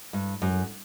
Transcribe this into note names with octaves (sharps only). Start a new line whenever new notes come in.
G2
F#2